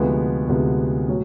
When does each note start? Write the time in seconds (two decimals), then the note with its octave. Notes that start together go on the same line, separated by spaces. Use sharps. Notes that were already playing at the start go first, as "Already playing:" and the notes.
Already playing: D2 C3 F3 G#3 B3
0.48 D2 C3 F3 G#3 B3
1.08 A2 F#3